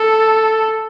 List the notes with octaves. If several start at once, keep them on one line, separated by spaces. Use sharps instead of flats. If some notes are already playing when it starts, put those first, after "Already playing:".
Already playing: A4